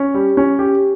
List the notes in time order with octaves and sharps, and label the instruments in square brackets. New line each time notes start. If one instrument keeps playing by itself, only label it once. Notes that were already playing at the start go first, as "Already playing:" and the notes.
Already playing: [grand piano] C#4
G3
C#4
G4